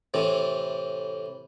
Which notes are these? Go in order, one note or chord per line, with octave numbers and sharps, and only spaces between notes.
A2 C3 E3